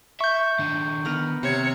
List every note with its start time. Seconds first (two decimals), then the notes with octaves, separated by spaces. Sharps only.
0.21 E5 C#6 G6
0.59 D#3 D4
1.05 B3 A#4 B4
1.43 C3 C#5